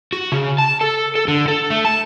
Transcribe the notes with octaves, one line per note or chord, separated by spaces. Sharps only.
F#4
C#3
A5
A4
A4
D3
A4
A3
A5